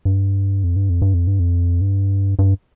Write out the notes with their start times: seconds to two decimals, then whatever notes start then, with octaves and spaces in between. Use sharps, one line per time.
0.05 G2
0.64 F2
0.76 G2
0.89 F2
1.02 G2
1.14 F2
1.27 G2
1.39 F2
1.81 G2
2.39 G2